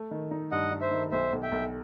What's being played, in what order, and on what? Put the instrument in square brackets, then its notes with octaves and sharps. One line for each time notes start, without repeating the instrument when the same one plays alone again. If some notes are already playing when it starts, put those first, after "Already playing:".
Already playing: [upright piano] A3
D#3
D#4
[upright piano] G2 [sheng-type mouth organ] D#5 F#5
[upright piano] D#4
[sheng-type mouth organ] C5 E5
[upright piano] D#3
[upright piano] B1 [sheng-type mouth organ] C5 E5
[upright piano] B1
[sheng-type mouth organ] E5 G5
[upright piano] B1